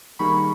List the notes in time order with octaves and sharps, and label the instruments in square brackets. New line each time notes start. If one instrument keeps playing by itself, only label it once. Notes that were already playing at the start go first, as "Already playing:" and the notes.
[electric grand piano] D#3 G3 A#3 D#4 G#4 [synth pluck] B5 C#6